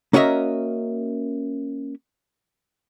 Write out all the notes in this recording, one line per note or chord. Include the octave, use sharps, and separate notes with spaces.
A#3 C#4 F#4 A#4 D#5 E5